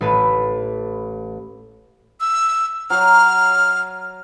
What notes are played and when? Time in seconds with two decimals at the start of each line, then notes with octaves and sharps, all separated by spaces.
0.01 A1 A3 B4
2.21 E6
2.90 F#3 F6